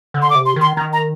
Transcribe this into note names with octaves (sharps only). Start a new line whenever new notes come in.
D3
C6
D6
C3
C6
D#3 C6
D#3 A#5
A#5